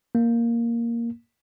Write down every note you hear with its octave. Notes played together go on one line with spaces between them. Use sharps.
A#3